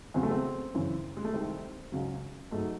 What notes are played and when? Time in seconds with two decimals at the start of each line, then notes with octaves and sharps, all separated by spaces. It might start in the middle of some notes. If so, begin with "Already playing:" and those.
0.14 E2 C#3 F#3 C4
0.23 A3
0.31 C4
0.74 F#2 C#3 E3
1.17 G#3
1.24 A3
1.33 C2 C3 D#3 C4
1.92 C#2 C#3 F#3
2.51 G#2 F#3 A3